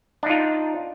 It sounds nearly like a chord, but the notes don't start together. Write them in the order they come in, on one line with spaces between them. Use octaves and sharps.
D4 D#4 F4